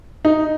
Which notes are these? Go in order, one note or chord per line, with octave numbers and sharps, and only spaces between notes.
D#4